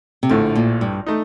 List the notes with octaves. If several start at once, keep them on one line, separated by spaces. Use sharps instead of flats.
C3
A#1 A2 D3 A3
A#2
G2
A3 D#4